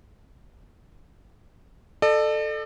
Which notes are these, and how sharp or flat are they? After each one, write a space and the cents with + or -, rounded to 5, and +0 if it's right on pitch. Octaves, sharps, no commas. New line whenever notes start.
A4 +0 D5 +45